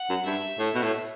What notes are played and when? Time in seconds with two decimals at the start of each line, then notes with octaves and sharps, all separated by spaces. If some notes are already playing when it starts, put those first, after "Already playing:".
Already playing: F#5
0.09 F#2
0.26 G2 E5
0.59 A2
0.75 B2
0.83 A2